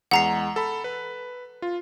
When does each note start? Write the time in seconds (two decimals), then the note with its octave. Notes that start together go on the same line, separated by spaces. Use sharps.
0.11 E2 G#3 F#5 A#5 C7
0.56 A4 B5
0.84 B4
1.62 F4